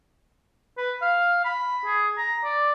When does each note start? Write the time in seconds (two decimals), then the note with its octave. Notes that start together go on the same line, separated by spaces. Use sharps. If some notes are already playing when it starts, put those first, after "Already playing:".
0.77 B4
1.02 F5
1.45 B5
1.86 G#4
2.17 A#5
2.44 D5